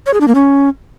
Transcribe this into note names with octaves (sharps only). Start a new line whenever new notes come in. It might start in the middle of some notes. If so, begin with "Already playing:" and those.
C#5
G#4
D4
A#3
C#4